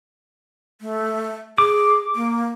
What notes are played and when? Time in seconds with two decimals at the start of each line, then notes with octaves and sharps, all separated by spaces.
0.81 A3
1.58 G#4 D6
2.15 A#3